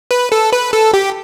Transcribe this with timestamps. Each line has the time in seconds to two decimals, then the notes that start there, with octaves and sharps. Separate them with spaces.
0.11 B4
0.32 A4
0.53 B4
0.73 A4
0.93 G4